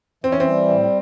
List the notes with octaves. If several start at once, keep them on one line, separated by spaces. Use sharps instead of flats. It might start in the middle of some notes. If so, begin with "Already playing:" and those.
E3 C4
C#4
C4
G3
A2